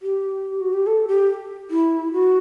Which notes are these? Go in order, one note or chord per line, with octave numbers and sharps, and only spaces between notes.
G4
F#4
G4
A4
G4
E4
F#4